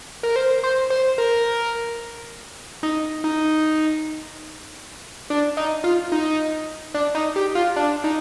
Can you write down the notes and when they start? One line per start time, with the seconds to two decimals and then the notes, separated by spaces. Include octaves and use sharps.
0.23 A#4
0.36 C5
0.64 C5
0.90 C5
1.18 A#4
2.83 D#4
3.24 D#4
5.30 D4
5.57 D#4
5.84 F4
6.12 D#4
6.94 D4
7.15 D#4
7.36 G4
7.55 F4
7.76 D4
8.04 D#4